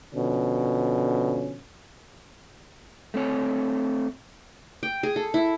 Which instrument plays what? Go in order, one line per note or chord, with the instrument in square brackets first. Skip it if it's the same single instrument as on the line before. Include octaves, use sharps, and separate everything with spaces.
[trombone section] B2 D3 F3 C#4
[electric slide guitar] A3 C4 C#5
[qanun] G5
G#4
A4
E4